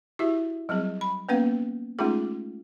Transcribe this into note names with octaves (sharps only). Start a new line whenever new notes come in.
E4 F#4 G4 E5
F#3 G3 C4 G#4
B5
A#3 B3 C#4 B4 F5 F#5
G#3 A3 C#4 D#4 F4 G#4